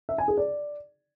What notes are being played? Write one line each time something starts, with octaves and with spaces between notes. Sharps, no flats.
E5
G#5
G#4
D5